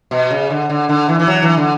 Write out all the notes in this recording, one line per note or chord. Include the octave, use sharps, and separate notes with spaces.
B2
C#3
D3
D3
D3
E3
E3
F#3
E3
D3